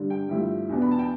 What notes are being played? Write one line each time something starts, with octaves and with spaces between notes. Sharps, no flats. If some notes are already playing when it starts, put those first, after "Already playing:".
Already playing: G2 D3 G3 D4
G5
G2 F3 A3 E4
E2 B2 B3 D4
B5
A5
G5